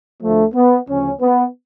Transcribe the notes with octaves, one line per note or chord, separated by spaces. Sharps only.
D2 D3 F3 A3
B3
D2 C#3 F3 C#4
B3